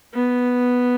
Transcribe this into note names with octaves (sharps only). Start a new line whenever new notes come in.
B3